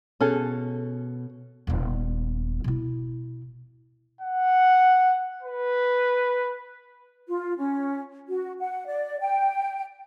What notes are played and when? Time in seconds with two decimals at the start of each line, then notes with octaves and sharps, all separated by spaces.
0.21 B2 C#4 G#4 A4
1.67 D#1 B3
2.64 B2 E4
4.21 F#5
5.43 B4
7.27 F4
7.58 C#4
8.28 F#4
8.60 F#5
8.86 D5
9.20 G5